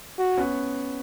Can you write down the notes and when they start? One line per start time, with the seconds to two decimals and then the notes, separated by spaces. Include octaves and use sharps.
0.18 F#4
0.37 B3 C#4